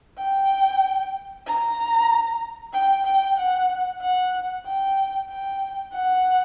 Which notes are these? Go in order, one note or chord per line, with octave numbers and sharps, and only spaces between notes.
G5
A#5
G5
G5
F#5
F#5
G5
G5
F#5